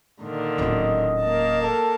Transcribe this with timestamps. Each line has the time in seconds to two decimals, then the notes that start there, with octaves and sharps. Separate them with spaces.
0.21 A#2 D3 D#3
0.58 D1 C#4 D#5
1.21 A#3 A#4 A5
1.63 A4